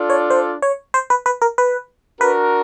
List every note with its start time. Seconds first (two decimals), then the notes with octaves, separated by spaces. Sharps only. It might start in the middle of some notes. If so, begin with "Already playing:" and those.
Already playing: D4 F4 A4 D5
0.10 C#5
0.30 C5
0.62 C#5
0.94 C5
1.10 B4
1.26 B4
1.42 A#4
1.58 B4
2.21 D4 F#4 A#4 B4